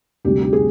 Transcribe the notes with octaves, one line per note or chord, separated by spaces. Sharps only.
D2 C3 G3 D4 G4
G4
G#4